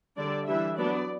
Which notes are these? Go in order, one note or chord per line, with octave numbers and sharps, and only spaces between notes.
D3 G3 D4 D5
E3 G3 D4 E5
F#3 B3 D4 D5